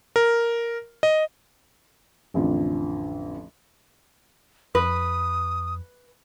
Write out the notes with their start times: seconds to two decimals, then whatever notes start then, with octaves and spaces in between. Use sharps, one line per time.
0.16 A#4
1.03 D#5
2.34 A1 F2 D3 F3
4.75 F2 B4 D#6